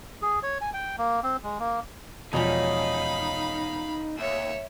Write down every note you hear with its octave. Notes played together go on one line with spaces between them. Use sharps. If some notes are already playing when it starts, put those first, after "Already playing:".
G#4
C#5
G#5
G5
A#3
C4
G#3
A#3
E1 F3 C#4 D#4 C#5 F5 A5 B5
D#2 C#5 E5